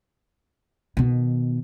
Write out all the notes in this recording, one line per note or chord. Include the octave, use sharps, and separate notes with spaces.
B2 D#3